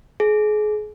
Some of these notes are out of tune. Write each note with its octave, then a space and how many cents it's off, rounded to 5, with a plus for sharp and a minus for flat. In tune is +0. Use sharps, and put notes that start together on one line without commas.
G#4 +30